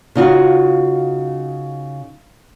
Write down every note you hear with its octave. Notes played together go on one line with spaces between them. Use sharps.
C#3 D#4 F4 F#4